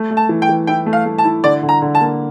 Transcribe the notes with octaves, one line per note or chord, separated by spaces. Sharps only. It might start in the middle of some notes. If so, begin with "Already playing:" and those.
Already playing: A3
A3
A5
E3
G5
E3
E4 G5
A3
F5
A3
A5
E4
D3 D5
D3
A#5
D3
A5
A#3